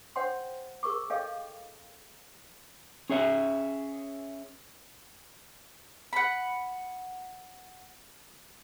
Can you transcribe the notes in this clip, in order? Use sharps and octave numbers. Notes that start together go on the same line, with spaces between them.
C5 C#5 F#5 G5 C6
G#4 A#4 C#6 D6
A4 C#5 D#5 F5 G5
C#4 G#4 C#5 E5
F#5 B5